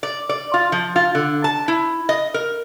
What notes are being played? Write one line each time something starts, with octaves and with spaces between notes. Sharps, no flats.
D5
D5
F4
F3
F4
D3
A5
E4
D#5
A#4